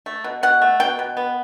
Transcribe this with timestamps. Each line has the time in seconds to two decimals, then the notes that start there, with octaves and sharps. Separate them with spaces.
0.06 A3
0.24 B2
0.43 B2 F#5
0.61 A3
0.80 B2 G5
0.99 B2
1.17 B3